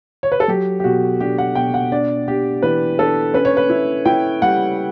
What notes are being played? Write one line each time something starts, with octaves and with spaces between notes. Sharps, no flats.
C#5
B4
A4
F#3 G4
G4
B2 F#4
D4 G4
F#5
B2 G5
F#5
D4 D5
D4 G4
E3 B4
D4 A4
C#4 B4
C#5
B4
E4
E4 G5
G3 F#5